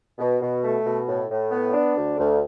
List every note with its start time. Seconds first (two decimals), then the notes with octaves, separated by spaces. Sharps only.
0.19 B2
0.41 B2
0.63 A3
0.85 B2
1.07 A2
1.29 A2
1.51 B3
1.74 D4
1.96 D2
2.18 D2